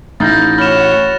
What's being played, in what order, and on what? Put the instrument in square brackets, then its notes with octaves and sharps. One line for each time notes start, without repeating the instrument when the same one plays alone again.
[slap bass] A1 [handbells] A3 D#4 G6 [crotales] A6 A#6
[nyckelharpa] F#4 C#5 [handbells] B5 [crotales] F6 E7